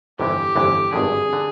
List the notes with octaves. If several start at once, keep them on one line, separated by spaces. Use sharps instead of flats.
G1 F2 C3 E3 G4
G1 F2 C3 E3
G#1 G2 D3 G#4
D3